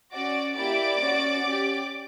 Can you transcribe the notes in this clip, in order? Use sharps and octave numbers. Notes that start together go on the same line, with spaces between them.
C#4 F#4 D5 D6
A#3 E4 G4 D5 D6
C#4 F#4
C#4 G4